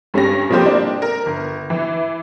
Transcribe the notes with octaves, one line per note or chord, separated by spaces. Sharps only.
G2 G3 C#4 A#6
C3 F3 G3 A#3 G4 C5
D4
A#4
G1
E3